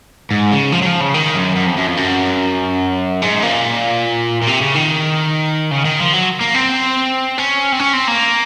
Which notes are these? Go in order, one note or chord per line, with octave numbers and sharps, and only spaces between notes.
G#2
C#3
F3
F#3
F3
C#3
D#3
F#2
F#2
F2
F#2
F2
F#2
G#2
A#2
A#2
C3
C#3
D#3
C#3
D#3
F3
F#3
A#3
C4
C#4
C4
C#4
C4
A#3